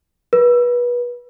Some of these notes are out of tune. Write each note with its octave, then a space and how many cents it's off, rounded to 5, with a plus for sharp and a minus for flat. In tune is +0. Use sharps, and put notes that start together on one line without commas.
B4 -30